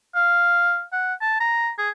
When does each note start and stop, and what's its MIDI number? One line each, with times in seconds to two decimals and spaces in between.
0.15 0.83 77
0.93 1.14 78
1.21 1.37 81
1.40 1.70 82
1.78 1.89 68